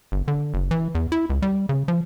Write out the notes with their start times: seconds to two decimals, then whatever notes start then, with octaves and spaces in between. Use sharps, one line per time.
0.12 G1
0.28 D3
0.54 F#1
0.71 E3
0.95 E2
1.12 E4
1.30 C#2
1.42 G3
1.69 C#3
1.88 F3